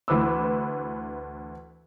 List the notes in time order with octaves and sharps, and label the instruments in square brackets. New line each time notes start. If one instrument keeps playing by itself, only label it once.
[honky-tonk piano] D2 E3 B4 D6 E6